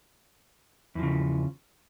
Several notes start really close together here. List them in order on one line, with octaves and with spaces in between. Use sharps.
E2 F3 C#3